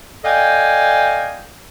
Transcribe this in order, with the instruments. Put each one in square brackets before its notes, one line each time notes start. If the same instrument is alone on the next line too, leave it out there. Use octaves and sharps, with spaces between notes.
[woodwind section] A4 D5 D#5 F5 G5 G#5